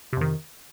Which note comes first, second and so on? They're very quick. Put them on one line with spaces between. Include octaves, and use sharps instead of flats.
C3 F2 D#3